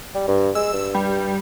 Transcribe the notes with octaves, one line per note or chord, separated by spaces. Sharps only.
G3
G2
G#3 E6
G2
G3